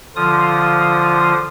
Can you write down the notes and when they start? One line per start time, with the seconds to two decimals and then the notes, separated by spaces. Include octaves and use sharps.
0.16 D3 F3 F4 D#6